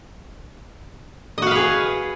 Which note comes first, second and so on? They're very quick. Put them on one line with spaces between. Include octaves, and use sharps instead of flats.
D#5 F#4 F5 B4 G#4